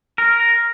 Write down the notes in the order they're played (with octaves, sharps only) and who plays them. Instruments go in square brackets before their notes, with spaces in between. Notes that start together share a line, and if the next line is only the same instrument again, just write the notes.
[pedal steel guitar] A#4